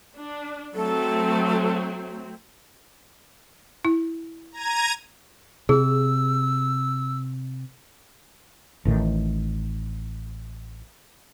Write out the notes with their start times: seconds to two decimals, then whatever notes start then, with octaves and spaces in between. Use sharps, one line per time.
0.16 D4
0.75 F#3 A3 C4 A4
3.85 E4
4.52 A#5 G#6 D#7
5.69 C3 G#4 E6
8.85 A1 A2 D#3